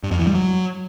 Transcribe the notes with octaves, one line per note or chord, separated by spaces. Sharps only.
G2
F2
E3
G3
F#3